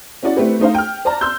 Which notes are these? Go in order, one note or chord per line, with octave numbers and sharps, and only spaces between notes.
C#4 E4 F#4 D5
A3 C4 E4 G4 B4
A3 D#4 C5 F5
G5 F6
C5 D5 A5 A#5
C6 E6 G6